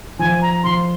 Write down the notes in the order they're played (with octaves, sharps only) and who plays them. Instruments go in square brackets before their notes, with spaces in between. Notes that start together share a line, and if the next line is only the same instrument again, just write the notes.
[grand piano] F3 [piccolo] G#5
[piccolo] A#5
[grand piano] F3 [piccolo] C6